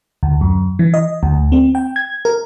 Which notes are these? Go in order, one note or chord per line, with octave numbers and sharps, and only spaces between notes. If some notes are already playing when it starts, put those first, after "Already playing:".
D2
F#2
E3
D#5
D2
C4
G5
G#6
A#4